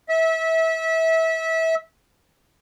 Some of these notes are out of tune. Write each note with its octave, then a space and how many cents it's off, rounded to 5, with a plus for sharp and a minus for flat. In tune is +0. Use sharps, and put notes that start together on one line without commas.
E5 -25